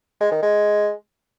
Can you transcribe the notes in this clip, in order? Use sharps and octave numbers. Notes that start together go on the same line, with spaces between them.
G#3
D#3
G#3